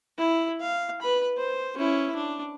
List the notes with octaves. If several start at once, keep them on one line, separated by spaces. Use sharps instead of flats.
E4
F5
B4 B5
C5
C#4 E4
D4